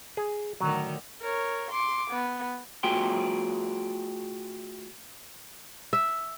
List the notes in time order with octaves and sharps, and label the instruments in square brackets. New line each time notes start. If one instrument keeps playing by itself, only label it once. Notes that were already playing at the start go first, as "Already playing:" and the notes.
[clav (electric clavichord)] G#4
[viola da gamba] A2 D3 D#3 [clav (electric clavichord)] F#3
[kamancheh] A#4 C#5
C6 D6
B3
[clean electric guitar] A3 F4 F#4 G#4 G5 C6
[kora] E5